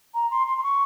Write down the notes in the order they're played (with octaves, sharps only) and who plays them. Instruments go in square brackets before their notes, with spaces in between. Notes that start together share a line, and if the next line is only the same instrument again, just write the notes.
[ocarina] A#5
C6
C6
C6
C#6